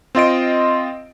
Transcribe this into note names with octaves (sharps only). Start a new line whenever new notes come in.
C4 F4 D#5 D7